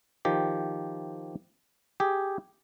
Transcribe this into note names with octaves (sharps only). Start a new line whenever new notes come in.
D#3 F3 G4
G4 G#4